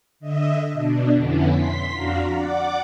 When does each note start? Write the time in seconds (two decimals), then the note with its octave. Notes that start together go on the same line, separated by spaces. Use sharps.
0.20 D3 D#5 E5
0.73 B2 D4
1.15 F2 D3 B3 C#4 E4
1.50 C6 B6
1.94 F2 D4 F#4 F5 A#5
2.30 D5 F#5 D6